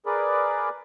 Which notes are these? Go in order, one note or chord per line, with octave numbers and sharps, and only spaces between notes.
G#4 A#4 B4 D5